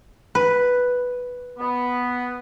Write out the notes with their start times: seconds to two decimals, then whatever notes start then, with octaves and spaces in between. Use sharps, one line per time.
0.35 B4
1.59 B3